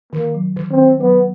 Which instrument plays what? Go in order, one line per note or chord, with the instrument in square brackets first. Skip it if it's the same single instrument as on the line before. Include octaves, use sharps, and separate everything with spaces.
[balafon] D#3 [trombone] A#3
[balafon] F#3
D#3
[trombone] C4
[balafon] D#3
[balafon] F#3 [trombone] B3